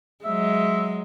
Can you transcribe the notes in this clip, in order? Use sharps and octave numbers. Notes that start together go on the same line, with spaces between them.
F#3 G#3 E5